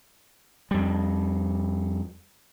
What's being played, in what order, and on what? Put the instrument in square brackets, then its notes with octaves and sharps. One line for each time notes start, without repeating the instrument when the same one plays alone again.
[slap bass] F2 G3